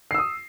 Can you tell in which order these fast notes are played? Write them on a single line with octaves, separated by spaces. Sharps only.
C7 E6 D#6